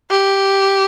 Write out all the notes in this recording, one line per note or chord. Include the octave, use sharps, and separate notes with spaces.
G4